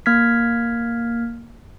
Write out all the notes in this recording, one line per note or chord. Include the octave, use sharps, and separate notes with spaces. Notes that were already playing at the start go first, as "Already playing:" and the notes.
A#3 F6 G#6 B6